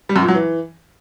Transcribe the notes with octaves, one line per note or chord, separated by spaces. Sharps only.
G3
F#2
A#2
F#3
E3